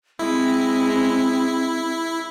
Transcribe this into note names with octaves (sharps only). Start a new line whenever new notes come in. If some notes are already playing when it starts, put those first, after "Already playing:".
G#3 C4 E4